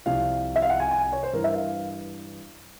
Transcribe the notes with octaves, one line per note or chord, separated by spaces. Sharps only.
C2 C3 F3 F5
E5
F5
F#5
G#5
G#5
C#5
C5
G2 E3 A#4
E5
F5